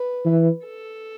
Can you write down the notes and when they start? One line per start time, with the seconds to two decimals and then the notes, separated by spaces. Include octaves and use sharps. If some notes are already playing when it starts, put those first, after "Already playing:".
Already playing: B4
0.25 E3
0.65 A4